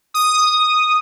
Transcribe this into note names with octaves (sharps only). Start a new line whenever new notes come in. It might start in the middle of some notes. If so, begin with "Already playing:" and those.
D#6